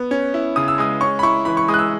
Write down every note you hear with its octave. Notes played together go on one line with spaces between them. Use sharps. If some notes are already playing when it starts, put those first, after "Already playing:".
Already playing: B3
C#4
E4
C#3 D#6
E6
G#3 D#6
C#4 C#6
B5
E4 C#6
E3 B5
C#6
G#3 D#6
F#6
E6